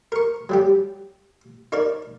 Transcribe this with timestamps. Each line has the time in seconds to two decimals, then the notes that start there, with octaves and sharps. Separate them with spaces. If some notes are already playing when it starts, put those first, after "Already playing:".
0.12 A#4 C#6
0.49 F#3 G3 G4
1.72 D#4 A#4 C#5 D5